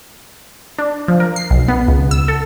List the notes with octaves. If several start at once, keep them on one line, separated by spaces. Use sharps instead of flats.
D4
F3
A#4
C7
B1
B3
C#2
E6
A4